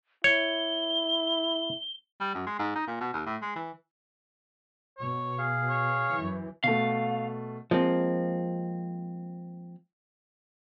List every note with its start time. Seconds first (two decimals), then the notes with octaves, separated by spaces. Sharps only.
0.24 E4 C#5 G7
2.20 G3
2.35 F#2
2.47 G#3
2.59 G#2
2.76 D#4
2.87 A#2
3.00 B2
3.14 D#2
3.26 A2
3.42 G#3
3.56 E3
4.98 B2 C#5
5.38 G#4 F5
5.69 C#5
6.14 F#2 E3
6.64 B2 A3 F5
7.71 F3 G#3 A#3 C4